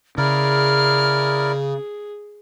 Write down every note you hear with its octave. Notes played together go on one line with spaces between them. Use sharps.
C#3 E4 G#4 A#4 D5 F6